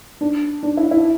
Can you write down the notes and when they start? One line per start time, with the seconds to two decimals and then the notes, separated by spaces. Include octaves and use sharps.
0.21 D4
0.63 D4
0.77 E4
0.91 E4